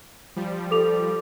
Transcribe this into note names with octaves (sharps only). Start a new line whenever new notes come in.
F3 G3
A4 D6 F7